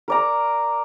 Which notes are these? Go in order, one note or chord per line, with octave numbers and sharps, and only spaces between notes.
A#4 D5 A#5